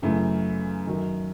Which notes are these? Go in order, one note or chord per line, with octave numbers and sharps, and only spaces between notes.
F#2 C#3 E3 A3
F#2 D#3 F#3